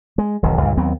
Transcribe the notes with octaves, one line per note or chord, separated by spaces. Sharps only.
G#3
E1 B1 E2 D#3
C#2 G2 A#2
D#2 F#3 B3 C4